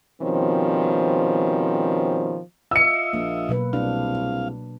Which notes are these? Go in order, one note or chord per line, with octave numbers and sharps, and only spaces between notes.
B2 D#3 F3 G3 C4 C#4
F4 D#5 E5 E6 C#7
A#1 A#3
B2 F#3 B4
C2 D4 F5